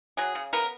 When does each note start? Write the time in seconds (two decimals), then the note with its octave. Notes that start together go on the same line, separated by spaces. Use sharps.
0.17 F#3 G#4
0.35 C#3
0.53 B3 A#4